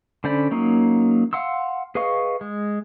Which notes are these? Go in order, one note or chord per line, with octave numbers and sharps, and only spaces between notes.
D3 C#4 C5 D5 B5
F#3 A#3 C#4 D#4 F5
F5 F#5 C6 E6
G#4 B4 D#5 F5 C#6
G#3